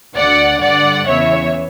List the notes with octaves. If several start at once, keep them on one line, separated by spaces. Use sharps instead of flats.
D2 D3 D5 F#5
G2 D3 D5 F#5
E2 C#3 E3 C#5 E5